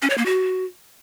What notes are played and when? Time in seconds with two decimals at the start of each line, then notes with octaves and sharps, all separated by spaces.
0.02 C#4
0.10 C#5
0.18 A#3
0.26 F#4